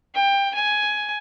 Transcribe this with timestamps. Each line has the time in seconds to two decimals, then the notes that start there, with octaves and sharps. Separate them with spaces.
0.15 G5
0.55 G#5